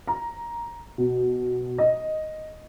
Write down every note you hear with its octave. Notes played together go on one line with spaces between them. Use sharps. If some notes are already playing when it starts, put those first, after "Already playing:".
A#5
B2
D#5